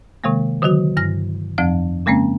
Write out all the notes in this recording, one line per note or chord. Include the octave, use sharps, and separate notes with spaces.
C3 D#3 G#3 A#3
D3 D#3 F#3 F#4
G2 F6 A#6
F2 F3 C4 F5
C#3 G#3 A#3 C4 C#4